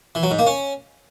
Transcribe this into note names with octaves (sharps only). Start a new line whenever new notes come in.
E3
F#3
G#2
A#3
C#4